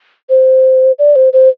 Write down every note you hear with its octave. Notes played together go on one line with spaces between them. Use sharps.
C5
D5
C5
C5